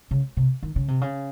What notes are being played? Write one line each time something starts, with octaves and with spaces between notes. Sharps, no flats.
C#3
C3
D#3
C#3
C3
C#3